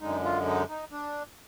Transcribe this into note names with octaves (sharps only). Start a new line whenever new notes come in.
F#2 D3 G#3 D#4
F4
D#4
D#4
D4